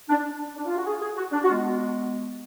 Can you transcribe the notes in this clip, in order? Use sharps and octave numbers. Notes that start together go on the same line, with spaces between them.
D4
D4
F4
F#4
G#4
G#4
F#4
D4
F#4
G#3 B3 F4